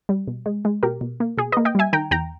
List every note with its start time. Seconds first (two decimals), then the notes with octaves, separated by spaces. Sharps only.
0.09 G3
0.27 B2
0.46 G#3
0.65 G#3
0.83 B2 G4 A#4
1.01 B2
1.20 A#3
1.38 B2 G#4
1.52 B4 D#5
1.57 A#3
1.65 D#5 G5
1.75 G3 E5 G#5
1.93 D#3 G5 A#5
2.11 E2 G5 A#5